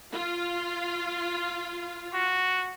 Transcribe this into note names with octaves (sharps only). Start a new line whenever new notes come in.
F4 F5
F#4